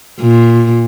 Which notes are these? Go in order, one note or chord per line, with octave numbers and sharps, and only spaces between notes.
A#2